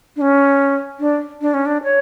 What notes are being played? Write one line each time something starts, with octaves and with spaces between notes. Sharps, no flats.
D4
C#4
D4
D4
C#4
D4
C#5